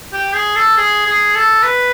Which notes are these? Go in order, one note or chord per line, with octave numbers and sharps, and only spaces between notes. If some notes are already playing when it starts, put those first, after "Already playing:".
G4
G#4
A4
G#4
G#4
A4
B4